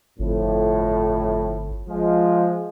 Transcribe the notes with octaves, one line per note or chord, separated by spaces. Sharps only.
G1 F2 A2
F3 G#3